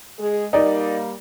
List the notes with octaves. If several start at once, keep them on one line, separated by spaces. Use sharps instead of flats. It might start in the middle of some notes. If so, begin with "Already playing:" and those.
G#3 G#4
G3 A#3 D#4 D5